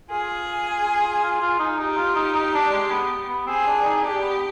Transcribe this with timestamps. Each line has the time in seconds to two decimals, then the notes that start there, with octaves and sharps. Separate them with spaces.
0.10 F4 G#4
1.23 F4
1.41 F4
1.60 D#4
1.79 D#4 G4
1.97 F4
2.16 D#4
2.35 D#4
2.54 D4
2.72 G#3
2.91 B3
3.29 B3
3.47 C4 G#4
3.67 D4
3.85 D#4
4.03 D4 G4
4.22 B3